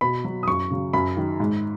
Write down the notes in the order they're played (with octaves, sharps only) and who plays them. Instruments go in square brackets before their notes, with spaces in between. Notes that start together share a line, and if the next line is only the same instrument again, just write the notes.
[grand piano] B2 B5
F#3
D#6
F#2 C#6
C#3 F#3
F#2 B5
D#3 F#3
G#2